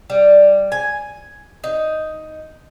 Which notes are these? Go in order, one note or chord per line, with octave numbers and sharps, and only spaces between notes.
G3
G#5
D#4